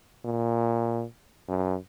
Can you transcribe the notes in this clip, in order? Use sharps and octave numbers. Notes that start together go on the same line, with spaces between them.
A#2
F#2